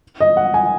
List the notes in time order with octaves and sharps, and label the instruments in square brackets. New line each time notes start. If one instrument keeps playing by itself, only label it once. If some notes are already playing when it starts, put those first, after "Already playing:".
[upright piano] D#5
F#5
G#5